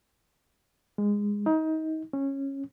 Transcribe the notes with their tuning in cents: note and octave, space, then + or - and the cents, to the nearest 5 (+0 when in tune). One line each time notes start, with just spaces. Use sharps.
G#3 -15
D#4 +25
C#4 -15